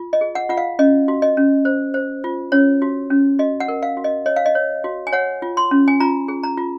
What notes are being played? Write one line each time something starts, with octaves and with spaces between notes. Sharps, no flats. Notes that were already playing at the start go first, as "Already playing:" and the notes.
Already playing: F4
D#5
G#4
F#5
F4 F#5
F5
C#4 D#5
F#4
D#5
C#4
C5
C5
F4
C#4 C#5
F#4
C#4
F#4 D#5
F#5
A#4
F5
F#4
D#5
C#5 D#5
F5
D#5
C#5
F#4
G#5
C#5 F#5
F4
C6
C#4
G#5
F4 A#5
G#4
A#5
F4